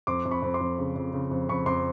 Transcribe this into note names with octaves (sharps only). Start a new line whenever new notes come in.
F2 C6 D6
F2
B5 C#6
F2
C6 D6
F2
C#3
F2
C#3
F2
F2 B5 C#6
F2 C6 D6